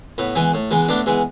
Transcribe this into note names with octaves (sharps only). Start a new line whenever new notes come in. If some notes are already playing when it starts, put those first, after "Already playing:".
A2 B3
E3 G#3 B3
A2
E3 G#3 B3
A2 B3 D4
E3 G#3 B3